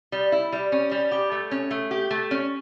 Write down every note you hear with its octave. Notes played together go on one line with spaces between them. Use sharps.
G3
E4
G3
C#4
G3
G4
A3
C#4
A3
G4
A3
C#4